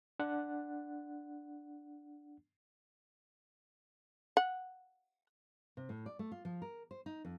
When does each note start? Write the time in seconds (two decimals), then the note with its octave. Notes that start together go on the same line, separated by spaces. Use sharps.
0.19 D4 F#5
4.37 F#5
5.77 C3
5.89 A2
6.06 D5
6.19 A3
6.32 F4
6.45 F3
6.62 A#4
6.91 C5
7.06 D#4
7.25 F2